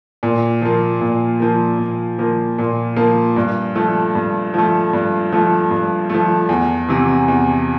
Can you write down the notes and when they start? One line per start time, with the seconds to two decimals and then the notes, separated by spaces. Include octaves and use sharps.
0.23 A#2
0.62 F3 A#3
1.01 A#2
1.40 F3 A#3
1.79 A#2
2.19 F3 A#3
2.58 A#2
2.96 F3 A#3
3.36 G2
3.75 F3 A3
4.15 G2
4.54 F3 A3
4.93 G2
5.32 F3 A3
5.71 G2
6.10 F3 A3
6.49 E2
6.88 C3 E3
7.28 E2